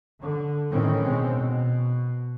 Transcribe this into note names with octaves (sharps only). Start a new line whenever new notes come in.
D3
A2 D#3 E3 C4 C#4
B2 G#3 C4
B2